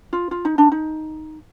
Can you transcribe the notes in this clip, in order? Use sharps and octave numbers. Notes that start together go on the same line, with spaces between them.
F4
F4
D#4
D4
D#4